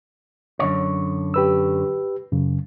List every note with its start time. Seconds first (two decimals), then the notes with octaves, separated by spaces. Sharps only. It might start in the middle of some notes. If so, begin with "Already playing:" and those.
0.59 F#2 D3 C#5
1.34 G4 B4 E6
2.32 F#2 C#3